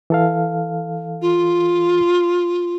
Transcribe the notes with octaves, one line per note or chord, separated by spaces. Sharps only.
E3 A4 F5
F4